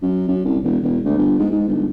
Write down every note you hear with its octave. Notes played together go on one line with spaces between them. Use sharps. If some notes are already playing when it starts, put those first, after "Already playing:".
F#2
F#2
C2
E1
E1
D2
G1
G#2
G#2
G1